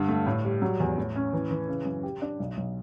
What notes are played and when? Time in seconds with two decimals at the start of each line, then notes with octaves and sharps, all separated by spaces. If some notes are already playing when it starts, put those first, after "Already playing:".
Already playing: G2 D3
0.08 A3
0.27 A2
0.45 G3
0.62 F#3
0.80 E2
0.98 A2
1.16 C#4
1.33 E3
1.51 E3
1.68 C#3
1.86 F#2
2.03 G4
2.22 D4
2.40 B1
2.57 B1